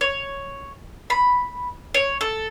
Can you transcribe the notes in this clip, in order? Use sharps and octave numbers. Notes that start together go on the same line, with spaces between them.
C#5
B5
C#5
A4